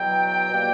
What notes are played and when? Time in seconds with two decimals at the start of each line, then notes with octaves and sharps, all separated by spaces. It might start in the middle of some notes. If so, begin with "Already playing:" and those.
Already playing: E2 B2 F#3 G5
0.50 B2 G3 A#3